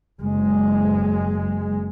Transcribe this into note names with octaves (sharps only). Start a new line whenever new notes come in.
F#1 G#3